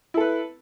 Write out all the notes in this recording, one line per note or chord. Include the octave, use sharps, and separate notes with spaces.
E4 A4 B4